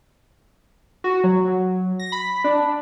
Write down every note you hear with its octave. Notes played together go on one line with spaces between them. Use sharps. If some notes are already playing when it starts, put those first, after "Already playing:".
F#4
F#3
F#3
A#6
B5
D4